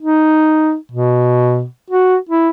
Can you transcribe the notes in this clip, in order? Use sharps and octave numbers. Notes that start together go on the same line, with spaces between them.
D#4
B2
F#4
E4